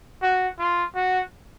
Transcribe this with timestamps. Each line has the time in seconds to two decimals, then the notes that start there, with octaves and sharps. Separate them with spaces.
0.22 F#4
0.59 F4
0.95 F#4